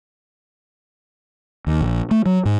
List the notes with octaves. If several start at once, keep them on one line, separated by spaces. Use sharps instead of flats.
D#2
A#1
A3
F#3
G#2